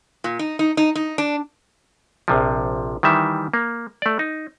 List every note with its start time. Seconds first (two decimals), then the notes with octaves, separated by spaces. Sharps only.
0.24 A#2
0.39 D#4
0.59 D#4
0.77 D#4
0.95 D#4
1.18 D4
2.28 A#1 C3 F3
3.03 D#3 E3 G3 E5
3.54 A#3
4.02 A3 D5
4.19 D#4